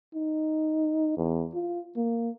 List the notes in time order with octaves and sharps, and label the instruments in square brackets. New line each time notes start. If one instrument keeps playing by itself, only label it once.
[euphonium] D#4
E2
F4
A#3